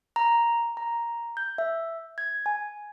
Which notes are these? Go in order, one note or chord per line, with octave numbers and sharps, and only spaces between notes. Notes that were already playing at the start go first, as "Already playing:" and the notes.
A#5
A#5
G6
E5
G#6
G#5